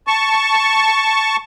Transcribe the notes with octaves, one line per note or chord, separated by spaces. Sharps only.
A5 C#6